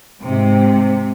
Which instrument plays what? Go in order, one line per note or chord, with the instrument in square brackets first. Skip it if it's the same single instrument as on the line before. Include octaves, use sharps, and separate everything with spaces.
[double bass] G#2 G#3 [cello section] C3